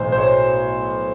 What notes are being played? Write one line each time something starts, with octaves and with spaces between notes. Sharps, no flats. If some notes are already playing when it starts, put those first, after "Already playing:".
Already playing: B1 A2 E3 C5
C5
C#5